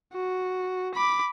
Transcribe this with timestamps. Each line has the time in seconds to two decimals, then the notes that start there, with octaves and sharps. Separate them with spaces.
0.13 F#4
0.94 B5 D6